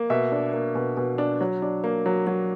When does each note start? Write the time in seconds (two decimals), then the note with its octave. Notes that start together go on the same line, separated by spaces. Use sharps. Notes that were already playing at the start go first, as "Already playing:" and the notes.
Already playing: A#3
0.10 B2 E5
0.32 D4
0.53 A#3
0.75 B2
0.97 B2
1.18 D4
1.41 F#3
1.62 D4
1.84 A#3
2.06 F#3
2.27 F#3